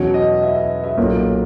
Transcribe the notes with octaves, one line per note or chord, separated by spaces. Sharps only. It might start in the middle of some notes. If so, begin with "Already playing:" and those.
Already playing: E2 B2 F#3 C#4 C#5
D#5
E5
E5
E5
B1 A#2 A#3 C#4